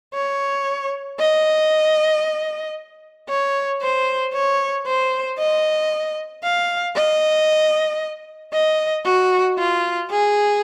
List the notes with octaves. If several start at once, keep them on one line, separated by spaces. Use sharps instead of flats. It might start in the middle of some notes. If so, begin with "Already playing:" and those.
C#5
D#5
C#5
C5
C#5
C5
D#5
F5
D#5
D#5
F#4
F4
G#4